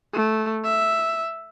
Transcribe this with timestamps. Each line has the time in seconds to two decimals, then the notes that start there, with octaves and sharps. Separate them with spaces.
0.13 A3
0.64 E5